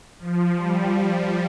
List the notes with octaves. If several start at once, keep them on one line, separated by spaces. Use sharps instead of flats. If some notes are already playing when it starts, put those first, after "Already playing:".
F3
G3